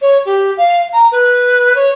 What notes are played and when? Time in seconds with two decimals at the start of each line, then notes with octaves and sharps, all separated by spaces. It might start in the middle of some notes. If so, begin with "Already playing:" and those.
0.01 C#5
0.25 G4
0.57 F5
0.92 A#5
1.11 B4
1.75 C#5